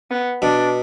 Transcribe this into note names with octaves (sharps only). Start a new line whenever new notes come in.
B3
B2 D4